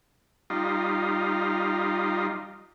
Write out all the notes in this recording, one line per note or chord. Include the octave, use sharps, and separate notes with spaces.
G3 D#4 F4